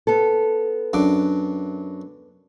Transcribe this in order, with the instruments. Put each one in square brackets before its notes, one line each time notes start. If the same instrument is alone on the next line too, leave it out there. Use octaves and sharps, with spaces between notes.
[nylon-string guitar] B3 A4
[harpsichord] F#2 D4 D6